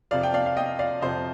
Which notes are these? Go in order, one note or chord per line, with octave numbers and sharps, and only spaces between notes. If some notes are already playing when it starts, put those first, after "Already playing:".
F2 C3 F3 D5 F5
G5
D5 F5
F5
D#5 G5
D5 F5
F2 C3 F3 C5 D#5